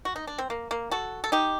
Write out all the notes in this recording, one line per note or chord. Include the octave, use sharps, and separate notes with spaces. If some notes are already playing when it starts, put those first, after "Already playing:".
F#4
D#4
D4
C4
A#3
A#3
F#4 A4
A4
D#4 G4